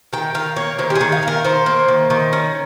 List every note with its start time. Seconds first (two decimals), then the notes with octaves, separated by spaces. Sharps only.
0.13 D#3 G5
0.34 D#3 F5
0.56 A#3 C#5
0.79 D#3 C5
0.90 G4
0.95 G#4
1.01 D#3
1.12 F5
1.23 D#3 A#4
1.45 D#3 C5
1.66 A#3
1.88 D#3
2.10 D#3
2.33 C#4